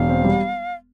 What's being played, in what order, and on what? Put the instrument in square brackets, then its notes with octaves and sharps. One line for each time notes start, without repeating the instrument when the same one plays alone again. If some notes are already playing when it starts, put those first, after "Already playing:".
Already playing: [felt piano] E1 [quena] F5
[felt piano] C4
G3